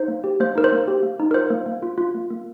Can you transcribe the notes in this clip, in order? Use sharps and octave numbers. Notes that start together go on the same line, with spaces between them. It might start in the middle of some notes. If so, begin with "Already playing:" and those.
Already playing: D#4 C5
A#3
G4
A#3 C5
D#4 A#4
C5
A#3
G4
A#3
D#4
A#4
F4 C5
A#3
A#3
F4
F4
A#3
A#3